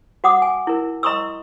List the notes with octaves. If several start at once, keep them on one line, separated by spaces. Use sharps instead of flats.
F#4 F#5 D6 D#6
G#5
E4 A#4
D#5 A#5 C6 C#6 D#6 E6